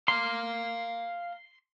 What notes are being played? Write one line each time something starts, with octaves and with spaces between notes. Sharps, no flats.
F5 A#5 C6